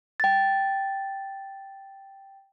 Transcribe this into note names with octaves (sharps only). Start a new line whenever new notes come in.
G5 A6